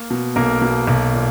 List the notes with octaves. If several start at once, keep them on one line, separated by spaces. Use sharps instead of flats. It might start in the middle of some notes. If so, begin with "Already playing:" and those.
Already playing: A#3 A#4
B2
B1 A#3 A#4
B2
B1
A#2